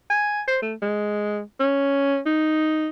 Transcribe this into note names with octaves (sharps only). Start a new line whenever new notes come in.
G#5
C5
A3
G#3
C#4
D#4